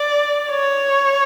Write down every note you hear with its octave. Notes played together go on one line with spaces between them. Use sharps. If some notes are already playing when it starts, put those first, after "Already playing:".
Already playing: D5
C#5